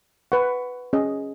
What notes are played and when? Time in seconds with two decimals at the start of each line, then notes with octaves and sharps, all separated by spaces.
0.32 B4 F#5 C#6
0.93 C#4 G#4 D#5